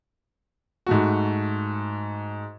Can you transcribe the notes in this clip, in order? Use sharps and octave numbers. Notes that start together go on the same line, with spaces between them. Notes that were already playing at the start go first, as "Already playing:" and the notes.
G#2 A3 F#4